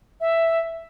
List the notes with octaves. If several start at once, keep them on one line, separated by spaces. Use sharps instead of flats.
E5